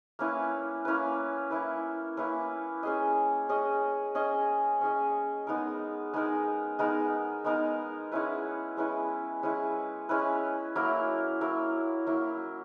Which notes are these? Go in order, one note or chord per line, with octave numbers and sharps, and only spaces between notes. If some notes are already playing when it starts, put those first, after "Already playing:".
A#3 C#4 E4 B4
A#3 C#4 E4 B4
A#3 C#4 E4 B4
A#3 C#4 E4 B4
C#4 G#4 D#5
C#4 G#4 D#5
C#4 G#4 D#5
C#4 G#4 D#5
G#3 B3 D#4 A#4
G#3 B3 D#4 A#4
G#3 B3 D#4 A#4
G#3 B3 D#4 A#4
G#3 C#4 E4 B4
G#3 C#4 E4 B4
G#3 C#4 E4 B4
G#3 C#4 E4 B4
F#3 A#3 E4 A#4
F#3 A#3 E4 A#4
F#3 A#3 E4 A#4